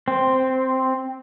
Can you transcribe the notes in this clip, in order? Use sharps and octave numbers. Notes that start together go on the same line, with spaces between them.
C4